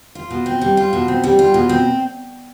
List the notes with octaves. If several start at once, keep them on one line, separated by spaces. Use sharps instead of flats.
F4
B2
C4
G3
F4
B2
C4
G3
F4
B2
C4